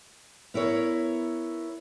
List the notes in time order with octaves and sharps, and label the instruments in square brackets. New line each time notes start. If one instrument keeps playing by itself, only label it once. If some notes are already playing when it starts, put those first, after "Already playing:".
[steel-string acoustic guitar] B3 E4 A#4 C#5